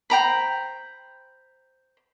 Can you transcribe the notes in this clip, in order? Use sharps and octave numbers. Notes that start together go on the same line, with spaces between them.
C5 G5 A#5 B5